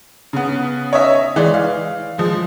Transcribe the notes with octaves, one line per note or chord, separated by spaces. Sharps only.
C#3 B3
C#5 D#5 E5
E3 G#3 D5
F5
F3 G#3